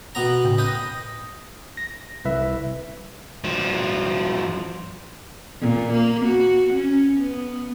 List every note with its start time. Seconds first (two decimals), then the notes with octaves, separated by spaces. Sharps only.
0.15 B2 B3 A#5
0.45 A2 C#3 G5
0.58 B4 D#5 D#6 G6 A#6
1.77 A#6
2.25 C2 B4 E5
3.44 G2 F3
5.61 A#2
5.93 A#3
6.25 F#4
6.74 C#4
7.20 B3